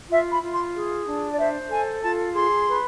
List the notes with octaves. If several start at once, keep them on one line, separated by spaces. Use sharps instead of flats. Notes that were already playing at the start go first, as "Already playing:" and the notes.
F4 E5
B5
F4
C6
G#4
D4
D5
C5 E5
A4 G#5
F4 A5
G#4 C6
B4